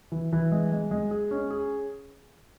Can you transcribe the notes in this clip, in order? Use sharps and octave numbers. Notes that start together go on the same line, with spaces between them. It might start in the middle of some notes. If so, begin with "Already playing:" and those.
E3
E3
G#3
G#3
G#3
G#4
C#4
G#4